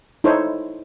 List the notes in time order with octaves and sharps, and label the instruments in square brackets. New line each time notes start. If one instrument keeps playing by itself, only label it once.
[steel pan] D#4 E4 A4 C5 C#5